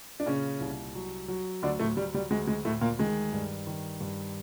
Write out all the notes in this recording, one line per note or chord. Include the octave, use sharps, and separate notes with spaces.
D4
A#2 C#3 C#4
C2
F#3
F#3
D2 D3 D4
A2 A3
F#3 G3
G3
D2 G#3
G#3
D2 A2 A3
A#2 A#3
D#3 G#3
G2
D#3
G2